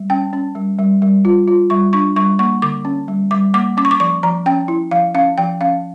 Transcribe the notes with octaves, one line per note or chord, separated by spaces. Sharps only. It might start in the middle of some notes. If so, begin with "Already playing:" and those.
Already playing: G3
C#4 G5
C#4
G3
G3
G3
F4
F4
G3 C#6
D4 C#6
G3 C#6
A#3 C#6
D3 D6
C#4
G3
G3 D6
A#3 D6
C#4 D6
C#6
D6
F3 C#6
F3 A#5
C#4 G5
E4
F3 F5
C#4 F5
F3 G5
C#4 F5